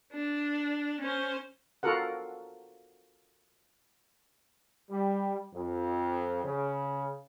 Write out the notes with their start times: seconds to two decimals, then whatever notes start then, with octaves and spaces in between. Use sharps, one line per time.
0.13 D4
1.01 C#4 C5
1.83 F4 F#4 A4 A#4 F#5
4.90 G3
5.53 F2
6.44 C#3